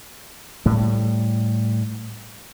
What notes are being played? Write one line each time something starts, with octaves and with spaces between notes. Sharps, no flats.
A2 G3